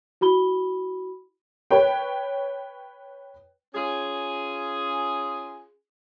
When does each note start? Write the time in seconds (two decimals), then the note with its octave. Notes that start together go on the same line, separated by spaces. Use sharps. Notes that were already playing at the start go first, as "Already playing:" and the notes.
0.21 E4 F#4 B5 G7
1.71 B4 C#5 G5
3.74 C#4 F4 G#4